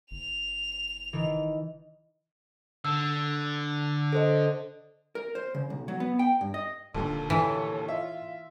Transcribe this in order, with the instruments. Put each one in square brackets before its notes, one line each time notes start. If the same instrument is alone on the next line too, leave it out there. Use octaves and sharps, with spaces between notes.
[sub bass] F#1 [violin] F7
[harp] D#3 E3
[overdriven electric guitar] D3 [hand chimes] E6
[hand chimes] A4 C5 D#5
[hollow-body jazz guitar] A#4
C5
C#3
B1
F#3
B3
G5
G2
D#5
[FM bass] D#1 [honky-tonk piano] D#2 A#2 D3 [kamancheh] A4
[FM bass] A2 [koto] E3 [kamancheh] A4 C#5
[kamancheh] F4 [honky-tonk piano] E5